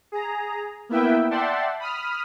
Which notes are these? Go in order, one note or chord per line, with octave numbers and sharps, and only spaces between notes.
G#4 A#5
A#3 B3 E4 B4 E5 G5
D5 E5 F#5 G5 A5 C6
B5 D#6 F6